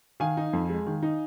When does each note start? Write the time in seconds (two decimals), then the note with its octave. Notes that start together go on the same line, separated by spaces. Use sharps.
0.20 D#3 F5 G#5
0.37 D#4
0.53 F2
0.69 G#3
0.86 D#3
1.03 D#4